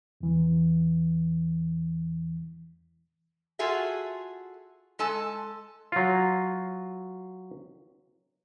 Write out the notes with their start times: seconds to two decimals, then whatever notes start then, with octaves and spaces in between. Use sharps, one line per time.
0.21 E2 E3
3.59 F4 F#4 G#4 A4 E5
4.99 G#3 A4 G#5 A5
5.92 F#3 F4